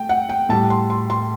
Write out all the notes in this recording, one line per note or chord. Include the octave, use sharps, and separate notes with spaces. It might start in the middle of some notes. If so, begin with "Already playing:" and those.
Already playing: A3 G5
F#5
G5
A2 G3 A5
C6
C6
C6